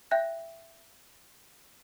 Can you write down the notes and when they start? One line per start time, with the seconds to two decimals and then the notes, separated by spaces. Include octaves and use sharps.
0.11 E5 G5 F#6 G6 A#6